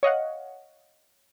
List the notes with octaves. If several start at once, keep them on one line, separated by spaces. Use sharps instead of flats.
C#5 D#5 F5 F#5